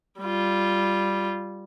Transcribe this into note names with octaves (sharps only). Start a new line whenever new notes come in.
G3 F4